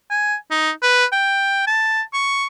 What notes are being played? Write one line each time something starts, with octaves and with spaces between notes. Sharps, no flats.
G#5
D#4
B4
G5
A5
C#6